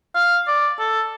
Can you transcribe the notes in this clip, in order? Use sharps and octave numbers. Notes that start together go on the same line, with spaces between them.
F5
D5
A4